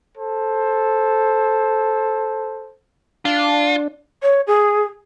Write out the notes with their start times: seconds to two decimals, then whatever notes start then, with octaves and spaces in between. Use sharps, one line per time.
0.18 A4 C5
3.25 D4 F4
4.23 C#5
4.47 G#4